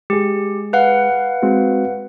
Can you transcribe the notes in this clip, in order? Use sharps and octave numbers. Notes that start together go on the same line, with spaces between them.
G#3 G4 G#4
B4 F5 F#5
G#3 C4 F#4